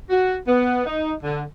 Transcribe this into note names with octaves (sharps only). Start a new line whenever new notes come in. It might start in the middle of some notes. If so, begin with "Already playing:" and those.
F#4
B3
D#4
D3